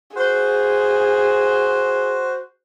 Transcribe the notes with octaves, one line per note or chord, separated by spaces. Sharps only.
F#4 G#4 C5